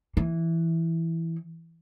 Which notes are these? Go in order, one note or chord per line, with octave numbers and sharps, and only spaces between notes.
E3